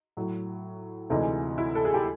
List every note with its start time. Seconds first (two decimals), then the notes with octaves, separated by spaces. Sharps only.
0.17 A2 F#3
1.10 D2 C3 E3 G#3 D#4
1.58 E4
1.75 A4
1.85 G#4
1.94 G4